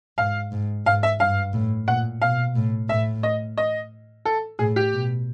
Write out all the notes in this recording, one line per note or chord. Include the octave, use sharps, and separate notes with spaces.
G#2 F5
G#2
G#2 F5
E5
G2 F5
A2
A#2 F#5
B2 F5
A2
A2 E5
D#5
D#5
A4
A2 G#4
G4
B2